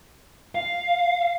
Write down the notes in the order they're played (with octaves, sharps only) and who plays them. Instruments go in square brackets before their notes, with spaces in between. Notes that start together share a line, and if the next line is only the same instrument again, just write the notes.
[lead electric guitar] F5